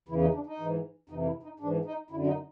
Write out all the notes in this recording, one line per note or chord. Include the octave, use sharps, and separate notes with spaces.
E2 C#3 E3 E4
D#4
D4
D#4
G#2 E3
F2 C3 E3 D#4
E4
D#4
G#2 E3 D4
D#4
F#2 D3 E4
D#4